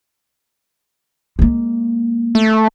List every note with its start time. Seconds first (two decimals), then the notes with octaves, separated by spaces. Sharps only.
1.39 G#3 A#3
2.35 A3